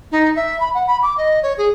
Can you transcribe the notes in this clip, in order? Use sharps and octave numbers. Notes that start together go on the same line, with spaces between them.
D#4
E5
B5
F#5
B5
D6
D#5
C#5
G#4